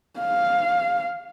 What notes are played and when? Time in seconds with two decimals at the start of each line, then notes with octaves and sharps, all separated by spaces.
0.20 F5